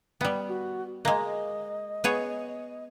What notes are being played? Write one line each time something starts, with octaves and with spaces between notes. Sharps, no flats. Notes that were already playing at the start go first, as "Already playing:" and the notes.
G3 B3 G5
F#4
G#3 A#3 D#5
B3 G#4 C#5